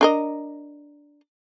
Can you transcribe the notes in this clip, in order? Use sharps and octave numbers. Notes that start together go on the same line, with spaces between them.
D4 A#4 D#5